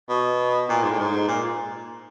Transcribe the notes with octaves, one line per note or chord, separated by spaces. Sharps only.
B2
A#2
G#2
A2
G#2
A#2